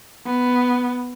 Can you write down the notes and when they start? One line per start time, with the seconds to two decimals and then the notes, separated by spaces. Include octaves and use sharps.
0.26 B3